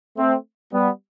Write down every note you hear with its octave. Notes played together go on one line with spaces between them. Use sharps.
A3 C4
G3 B3